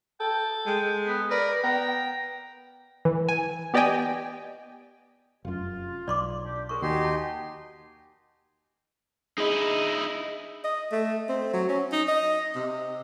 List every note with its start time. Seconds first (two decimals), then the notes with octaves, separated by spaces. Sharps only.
0.20 A4 G5
0.66 G#3 G5
1.07 B3
1.31 A#4 B4 D5
1.64 B3 G5 A#5
3.05 E3
3.29 G#5
3.74 B3 G4 D5 D#5 G5 G#5
5.45 F1 F#2 F4
6.08 B1 D5 C6 D6
6.45 D4 G4
6.69 C#2 G#3 A#4 C#6
6.82 D#2 D#4 F#4 G4 G#5 C6
7.05 A5
9.38 D#4 E4 G#4 D#5
10.64 D#5
10.92 A3
11.29 C4
11.53 F#3
11.69 C#4
11.92 D#4
12.08 D#5
12.56 C3